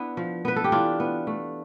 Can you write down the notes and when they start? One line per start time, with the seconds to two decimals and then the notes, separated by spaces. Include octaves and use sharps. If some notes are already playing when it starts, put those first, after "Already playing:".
Already playing: B3 D4 E4
0.17 F3
0.45 B3 B4
0.56 A4
0.64 G4
0.72 E3 D4 F4
1.00 B3
1.27 A3